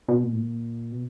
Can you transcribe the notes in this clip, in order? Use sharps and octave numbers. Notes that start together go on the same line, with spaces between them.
B2
A#2
A2
A#2
B2